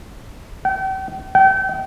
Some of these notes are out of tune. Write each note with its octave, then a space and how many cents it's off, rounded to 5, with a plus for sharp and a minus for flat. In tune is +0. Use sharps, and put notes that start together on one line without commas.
G5 -40
G5 -35